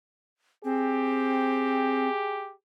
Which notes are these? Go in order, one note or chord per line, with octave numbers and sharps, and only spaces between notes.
C4 G4 G#4